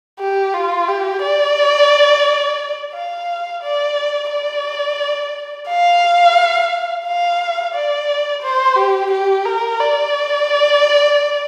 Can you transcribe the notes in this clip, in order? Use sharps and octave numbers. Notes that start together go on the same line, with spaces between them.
G4
F4
G4
D5
F5
D5
D5
F5
F5
D5
C5
G4
G4
A#4
D5